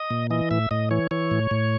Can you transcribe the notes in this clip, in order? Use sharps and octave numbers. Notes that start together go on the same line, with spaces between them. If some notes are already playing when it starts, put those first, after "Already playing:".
Already playing: D#5
A#2
E3 D#5
A2 E5
A2 D#5
E3 C#5
E3 C#5
A2
A2